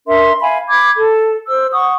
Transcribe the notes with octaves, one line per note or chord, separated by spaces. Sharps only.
D4 A#4 E5 C6
E5 F5 G#5 B5
B5 D6 G#6
A4
C5 E6
F#5 C#6 D#6